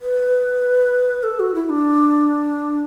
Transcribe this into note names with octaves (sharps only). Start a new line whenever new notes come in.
B4
A4
F#4
E4
D4